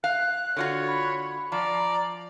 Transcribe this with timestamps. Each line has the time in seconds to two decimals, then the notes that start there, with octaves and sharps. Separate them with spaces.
0.04 F5 F#6
0.57 D3 F4 F#4 C#5
0.88 B5
1.52 F3 D5 A#5